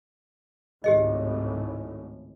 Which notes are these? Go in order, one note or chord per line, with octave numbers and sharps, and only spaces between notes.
G#1 C#2 A2 G4 G#4 D#5